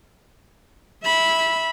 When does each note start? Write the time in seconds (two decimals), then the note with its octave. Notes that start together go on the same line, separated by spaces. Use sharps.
1.04 E5 B5